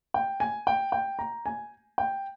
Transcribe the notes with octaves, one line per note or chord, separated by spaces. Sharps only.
G5
G#5
G5
G5
A#5
G#5
G5